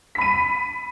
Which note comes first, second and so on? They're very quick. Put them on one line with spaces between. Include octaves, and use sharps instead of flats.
B6 B5 D#7